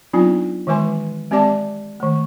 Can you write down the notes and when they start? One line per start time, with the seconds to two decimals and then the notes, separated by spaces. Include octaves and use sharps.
0.13 F#3 B3 C4 D4 D#4 F4
0.67 D#3 E3 G#3 B4 G#5 C6
1.31 G#3 C4 G4 D5 A5 D6
2.00 D#3 A3